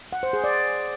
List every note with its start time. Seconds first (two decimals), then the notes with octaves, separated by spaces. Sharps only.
0.13 F#5
0.23 C5
0.33 G#4
0.44 D5